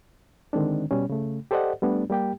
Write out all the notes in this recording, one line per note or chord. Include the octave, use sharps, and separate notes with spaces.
D3 D#3 G#3 C4 D4
B2 G3 C#4
C#3 A3
G4 A4 C5 D5 D#5 F#5
G3 A3 B3 D4
G3 A#3 G4 G5